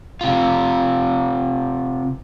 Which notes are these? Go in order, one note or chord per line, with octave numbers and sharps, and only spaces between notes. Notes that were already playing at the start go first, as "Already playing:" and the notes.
C3 F4